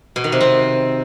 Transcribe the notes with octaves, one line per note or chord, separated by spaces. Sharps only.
B2
D#3
C3
C4